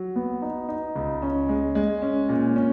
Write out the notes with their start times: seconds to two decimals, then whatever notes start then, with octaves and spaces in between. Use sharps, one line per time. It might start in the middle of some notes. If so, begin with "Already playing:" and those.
Already playing: F#3
0.16 B3
0.42 D#4
0.69 D#4
0.96 C#2
1.22 C#4
1.49 G#3
1.75 G#3
2.02 C#4
2.29 A#2
2.56 C#4